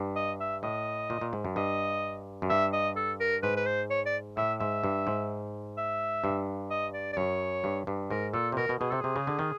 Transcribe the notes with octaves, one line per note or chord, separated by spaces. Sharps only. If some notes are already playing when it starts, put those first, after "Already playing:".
Already playing: G2
D#5
E5
A2 D#5
A#2
A#2
G#2
F#2
G2 D#5
F#2
G2 E5
D#5
A4
A#4
G#2 B4
B4
C5
C#5
D5
A2 E5
G#2 E5
G2
G#2
E5
G2
D#5
D5
D5
F#2 C#5
G2
G2
G#2 A#4
A#2 A4
C3
B2 A#4
B2
B2 G#4
C3 A4
C3 G#4
C#3
D3
D#3